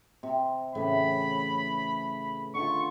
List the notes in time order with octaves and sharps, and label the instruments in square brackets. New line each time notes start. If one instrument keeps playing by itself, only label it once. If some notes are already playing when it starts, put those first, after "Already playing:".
[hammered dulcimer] C3
[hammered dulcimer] A2 C#3 E3 [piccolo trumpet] B5
[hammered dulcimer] D3 F4 [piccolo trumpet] C#6